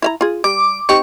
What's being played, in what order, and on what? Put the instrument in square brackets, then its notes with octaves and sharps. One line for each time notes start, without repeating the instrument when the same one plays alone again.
[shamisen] E4 F5 A#5
F4 G#4
[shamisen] G3 [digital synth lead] D6
[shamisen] C4 D#4 G4 [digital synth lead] C#6